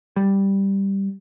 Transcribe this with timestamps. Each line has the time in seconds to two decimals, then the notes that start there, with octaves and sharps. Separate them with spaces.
0.16 G3